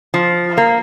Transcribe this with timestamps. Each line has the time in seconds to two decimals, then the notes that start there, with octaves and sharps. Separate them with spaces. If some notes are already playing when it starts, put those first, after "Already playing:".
0.14 F3
0.57 A#3